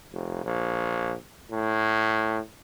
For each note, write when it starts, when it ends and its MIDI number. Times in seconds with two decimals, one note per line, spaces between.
0.13 0.42 29
0.44 1.15 34
1.51 2.40 45